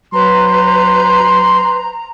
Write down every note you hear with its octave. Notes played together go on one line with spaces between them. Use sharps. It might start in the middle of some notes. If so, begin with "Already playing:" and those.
F#3 B4 C5 A#5 C6